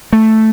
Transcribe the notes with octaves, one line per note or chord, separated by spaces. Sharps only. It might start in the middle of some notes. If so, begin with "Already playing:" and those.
A3